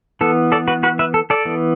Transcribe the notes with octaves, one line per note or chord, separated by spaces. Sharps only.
E3 B3 A4
A4 D5
F#4 B4
F#4 B4
B4 E5
A4
A4 D5
E3 B3